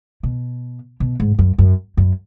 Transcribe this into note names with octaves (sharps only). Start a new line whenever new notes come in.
B2
B2
G#2
F#2
F#2
F#2